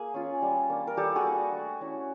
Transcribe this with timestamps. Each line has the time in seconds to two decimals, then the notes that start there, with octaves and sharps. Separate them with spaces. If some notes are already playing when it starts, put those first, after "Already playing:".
Already playing: A#3 G#4
0.14 C#4 F4
0.42 G3
0.70 A#3 D4
0.87 A#4
0.97 G3 G4 A4
1.16 F#4 G#4
1.25 A#3 D4
1.53 A3
1.81 C#4 E4